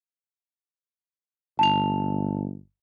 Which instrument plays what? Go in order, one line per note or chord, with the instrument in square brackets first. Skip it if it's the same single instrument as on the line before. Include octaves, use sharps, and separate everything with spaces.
[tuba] G1 [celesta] A5 F7